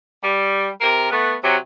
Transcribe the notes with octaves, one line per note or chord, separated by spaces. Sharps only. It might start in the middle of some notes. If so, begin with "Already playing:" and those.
G3
C3 A#4
A3 B3
C3 F#3